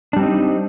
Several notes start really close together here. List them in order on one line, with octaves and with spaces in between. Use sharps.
D4 G3 C4 D#4